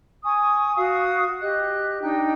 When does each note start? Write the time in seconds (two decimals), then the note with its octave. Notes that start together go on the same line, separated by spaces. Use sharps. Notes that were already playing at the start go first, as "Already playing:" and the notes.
0.24 G#5 C#6 D#6
0.76 F#4 F5 C#6 D#6
1.41 G4 D#5 F#6
2.01 D4 D#4 G5